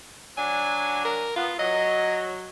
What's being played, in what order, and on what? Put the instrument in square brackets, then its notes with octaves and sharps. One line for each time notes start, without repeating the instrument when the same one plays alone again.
[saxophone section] F#3 D4 [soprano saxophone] G#5
[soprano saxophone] A#4
[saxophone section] B3 [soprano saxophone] F4
[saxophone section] F#3 [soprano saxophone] D#5